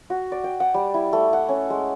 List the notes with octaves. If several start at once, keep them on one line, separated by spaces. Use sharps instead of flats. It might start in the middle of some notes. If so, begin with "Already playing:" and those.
F#4
D5
G5
F#5
G3
E4
A3
F#5
C#4
G#3